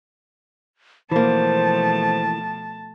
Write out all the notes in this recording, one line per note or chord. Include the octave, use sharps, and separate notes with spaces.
B2 E3 F3 A3 A#3 C5 A5